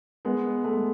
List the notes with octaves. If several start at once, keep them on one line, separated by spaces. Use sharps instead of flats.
G#3 B3
A3
G#3